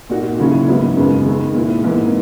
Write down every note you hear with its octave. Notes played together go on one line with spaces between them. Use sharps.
A#2 A#3 D#4 F#4
D#2 C#3 F#3 C#4 E4
G#2 F#3 B3 E4
F#2 C#3 G#3 B3
D#3 G#3 B3
A#2 A#3 E4
G#2 E3 A#3